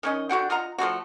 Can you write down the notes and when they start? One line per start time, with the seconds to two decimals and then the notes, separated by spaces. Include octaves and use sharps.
0.03 D#3 C#4 D#5
0.29 D3 F#4 F#5 G5
0.50 F4 D#5 F#5 A#5
0.78 F3 G#3 A3 F#4